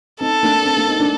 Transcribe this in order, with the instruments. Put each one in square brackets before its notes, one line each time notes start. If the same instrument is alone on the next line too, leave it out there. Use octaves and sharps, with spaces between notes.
[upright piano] C4 D#4 [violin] A4
[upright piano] A#3 D4
C4
A#3 D4
C4 D#4
A#3 D4